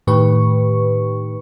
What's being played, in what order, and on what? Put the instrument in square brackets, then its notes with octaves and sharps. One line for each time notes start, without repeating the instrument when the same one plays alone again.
[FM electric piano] A2 D#3 G4 B4 C#6